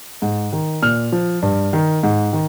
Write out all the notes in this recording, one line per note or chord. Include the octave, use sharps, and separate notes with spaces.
G#2
D#3
A#2 F6
F3
G2
D#3
G#2
D#3